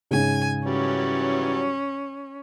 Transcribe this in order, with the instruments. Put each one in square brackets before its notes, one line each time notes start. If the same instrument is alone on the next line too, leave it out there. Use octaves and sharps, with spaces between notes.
[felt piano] G#2 C#3 [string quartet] G#5
[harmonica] E3 F#3 G3 [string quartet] C#4